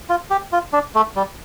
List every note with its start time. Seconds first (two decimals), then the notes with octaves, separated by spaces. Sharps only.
0.09 F4
0.30 G4
0.52 F4
0.73 D4
0.95 A3
1.16 G3